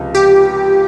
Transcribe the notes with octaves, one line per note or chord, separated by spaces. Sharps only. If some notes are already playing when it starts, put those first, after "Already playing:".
Already playing: C#2 C3 F3 G#3
G4